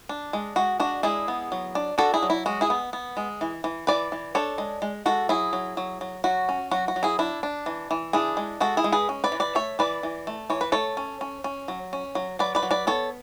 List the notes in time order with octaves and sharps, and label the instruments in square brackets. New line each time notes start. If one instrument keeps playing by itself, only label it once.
[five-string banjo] D4
G#3
G#3 F#4
D4 F#4
G#3 E4 G#4
B3
F#3
D4
D4 F#4 A4
E4 G#4
F#3
E4
G#3 F#4
E4 G#4
B3
B3
G#3
E3
E3
E3 B4 D5
E3
D4 A4 C#5
G#3
G#3
G#3 F#4 A4
F#3 E4 G#4
F#3
F#3
F#3
F#3 F#4
C#4
F#3 F#4
F#4
F#3
E4 G#4
D4 E4
D4
E3
E3
D4 E4 G#4
G#3
G#3 F#4 A4
E4 G#4
G#3
G#4 B4
C#4
B4 D5
E3
B4 D5
A3 C#5 E5
E3 B4 D5
E3
A3
E3 C#5
B4
A3 A4 C#5
C#4
C#4
C#4
F#3
C#4
F#3
F#3 B4 D5
B4 D5
F#3
B4 D5
B3 A4 C#5